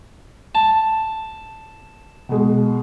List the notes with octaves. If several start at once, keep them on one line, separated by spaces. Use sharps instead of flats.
A5
B2 G#3